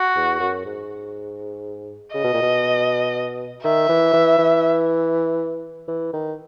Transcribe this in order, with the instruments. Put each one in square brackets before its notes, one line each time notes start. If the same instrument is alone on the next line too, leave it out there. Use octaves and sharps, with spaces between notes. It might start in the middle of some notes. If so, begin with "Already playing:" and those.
Already playing: [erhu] F#4
[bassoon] E2
F#2
G#2
[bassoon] C#3 [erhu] D#5
[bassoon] B2
A#2
B2
[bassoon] D#3 [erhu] E5
[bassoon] E3
E3
E3
E3
D#3